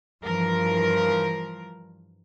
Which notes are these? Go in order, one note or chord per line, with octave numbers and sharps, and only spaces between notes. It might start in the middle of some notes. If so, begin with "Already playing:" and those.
G2 E3 F3 A#4